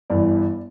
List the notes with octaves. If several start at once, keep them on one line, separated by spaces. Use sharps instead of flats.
G1 G2 E3 D5